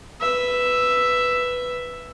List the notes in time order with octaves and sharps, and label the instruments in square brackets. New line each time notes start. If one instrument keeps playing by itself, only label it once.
[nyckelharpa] B4 E5